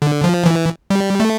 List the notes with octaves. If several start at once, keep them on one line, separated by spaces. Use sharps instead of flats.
D3
F3
E3
G3
A3